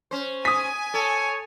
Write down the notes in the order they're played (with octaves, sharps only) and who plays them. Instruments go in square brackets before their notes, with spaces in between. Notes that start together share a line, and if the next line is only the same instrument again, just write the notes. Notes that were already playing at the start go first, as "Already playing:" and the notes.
[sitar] C#4 C5
[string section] G#5 [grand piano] D#6 B6
[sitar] A4 [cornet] C#5